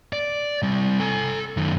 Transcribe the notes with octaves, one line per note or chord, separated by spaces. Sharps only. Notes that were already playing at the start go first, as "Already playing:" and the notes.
D5
C3 G3
A4 G#5
F#2 D#3